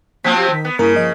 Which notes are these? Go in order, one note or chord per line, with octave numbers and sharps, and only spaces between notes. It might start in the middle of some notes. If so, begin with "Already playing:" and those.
F3 F#3 A#3 C4 B6
G4
D#3
B3
G2 C#3 A#3 E4 A#4
F3 D#5